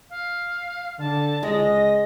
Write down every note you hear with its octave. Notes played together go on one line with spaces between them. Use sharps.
F5
D3 A5
C#2 G#3 D#5 A#6